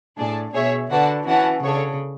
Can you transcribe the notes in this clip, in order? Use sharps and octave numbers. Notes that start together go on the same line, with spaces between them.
A2 D4 G#4 D5 A5
B2 G#4 C#5 E5
D3 F#4 B4 D5 F#5 A5
E3 C#4 F#4 B4 F#5 A5
C#3 D4 A4 C#5